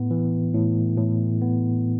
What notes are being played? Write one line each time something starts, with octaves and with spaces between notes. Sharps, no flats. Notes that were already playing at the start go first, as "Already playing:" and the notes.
Already playing: A2 B3
E3
A2
A2
B3